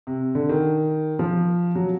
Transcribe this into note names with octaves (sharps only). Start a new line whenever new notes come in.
C3
D3
D#3
F3
F#3